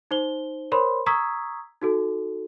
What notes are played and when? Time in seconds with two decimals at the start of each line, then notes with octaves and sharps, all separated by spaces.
0.11 D#4 C5 G7
0.72 A#4 C5 C#5 B5 C6
1.06 A#5 C#6 D#6 E6 G#6 B6
1.82 D#4 F#4 A4